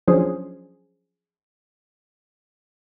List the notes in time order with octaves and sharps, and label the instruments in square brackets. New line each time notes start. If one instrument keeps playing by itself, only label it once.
[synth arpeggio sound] F3 F#3 C#4 D4 G#4 C5